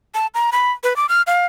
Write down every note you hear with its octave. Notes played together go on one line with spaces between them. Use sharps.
A5
A#5
B5
B4
D6
F6
F5